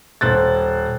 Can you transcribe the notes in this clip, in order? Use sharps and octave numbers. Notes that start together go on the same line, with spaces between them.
D#1 C5 F#6 A6